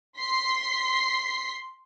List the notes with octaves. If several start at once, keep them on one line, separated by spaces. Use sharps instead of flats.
C6 B6 C7